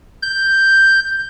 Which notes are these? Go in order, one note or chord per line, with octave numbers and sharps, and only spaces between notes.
G6